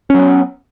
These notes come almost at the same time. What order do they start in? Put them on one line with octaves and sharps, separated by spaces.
C#4 F#3 B3